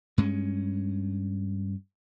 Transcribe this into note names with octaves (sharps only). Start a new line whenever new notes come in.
G2 G#3 C#4